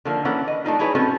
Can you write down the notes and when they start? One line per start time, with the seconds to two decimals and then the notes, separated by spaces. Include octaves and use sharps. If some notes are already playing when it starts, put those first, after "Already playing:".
0.05 D3 D#3 F3 A#3
0.25 E3 A#3 C#4 A4 F#5
0.48 D#5
0.64 A3 D4 D#4 F4
0.79 F#3 D#4 E4 G#4 B4 C#5
0.95 A2 C4 C#4 F#4 A4